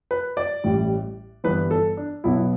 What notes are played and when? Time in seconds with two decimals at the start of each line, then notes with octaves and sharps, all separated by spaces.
0.11 B4
0.37 D5
0.64 A1 A2 G3
1.44 G1 G2 E3 B3 B4
1.71 A4
1.97 D4
2.24 B1 B2 B3 E4